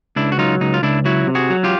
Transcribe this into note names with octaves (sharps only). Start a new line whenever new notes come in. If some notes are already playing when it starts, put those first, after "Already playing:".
C#2 D4 E4
F#4
F#3 D#4 F4
C#2 D#4
F4
C#2 D4 E4
F#3 E4 F#4
C3
F#4 G#4
F#3
F4 G4